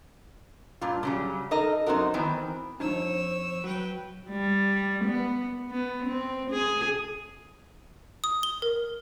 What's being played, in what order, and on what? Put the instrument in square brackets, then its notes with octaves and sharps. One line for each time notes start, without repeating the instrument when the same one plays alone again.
[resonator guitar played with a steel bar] G2 A#2 F4
C#3 F#3 G3
D#4 A4 A#4 D#5
F#2 C4 D#4 F#4 A#4
D#3 E3 B3 C4
[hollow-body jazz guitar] C2 F2 [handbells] D4 D#4 [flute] C5 [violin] C#5 E6
[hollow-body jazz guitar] F#3 [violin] B4 G5
[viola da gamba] G3
B3
B3
C4
G#4
[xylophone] D#6
G7
A#4